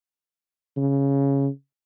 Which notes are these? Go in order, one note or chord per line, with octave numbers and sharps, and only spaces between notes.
C#3